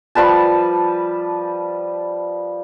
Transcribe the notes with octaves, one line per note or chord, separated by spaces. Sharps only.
F3 G3 B4 A5